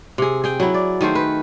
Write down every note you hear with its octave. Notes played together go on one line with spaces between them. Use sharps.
C3 G#4
G#4 G5
F#3 E4
D5
D#3 A3 G#4 C5
B4